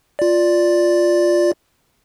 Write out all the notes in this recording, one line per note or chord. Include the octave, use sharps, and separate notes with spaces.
F4 D5